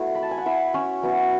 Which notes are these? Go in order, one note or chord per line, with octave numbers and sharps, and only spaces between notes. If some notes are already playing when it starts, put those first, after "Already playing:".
Already playing: A3 B3 E4 F#4
B5
A5
G#5
F#5
E4 E5
C#4 C#5
F#3 B3 E4